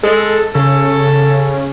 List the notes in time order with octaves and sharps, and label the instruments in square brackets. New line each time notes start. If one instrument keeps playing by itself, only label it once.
[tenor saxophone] G#3 [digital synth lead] A4
[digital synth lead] C#3 [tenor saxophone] A4